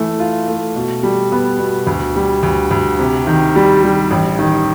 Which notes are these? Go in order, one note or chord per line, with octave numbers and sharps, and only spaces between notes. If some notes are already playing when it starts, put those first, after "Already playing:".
Already playing: E3 A3
F4
A3
B2
G3
B3
B2
D2
G3
D2
D2
C3
D#3
G3
G3
A1
D#3